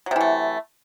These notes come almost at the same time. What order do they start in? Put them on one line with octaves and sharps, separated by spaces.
F#3 C3 E3 A3